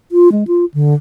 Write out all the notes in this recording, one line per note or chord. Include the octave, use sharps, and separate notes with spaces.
F4
G#3
F4
D3